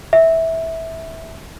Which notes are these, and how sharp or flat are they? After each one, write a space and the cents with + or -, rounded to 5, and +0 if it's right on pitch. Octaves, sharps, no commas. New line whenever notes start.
E5 -15